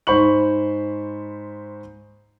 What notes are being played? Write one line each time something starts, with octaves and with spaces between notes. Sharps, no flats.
G#2 C5 B5 C#6 F#7